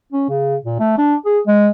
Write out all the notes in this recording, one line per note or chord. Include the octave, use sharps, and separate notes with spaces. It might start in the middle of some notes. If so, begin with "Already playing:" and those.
C#4
C#3
A#2
A3
D4
G#4
G#3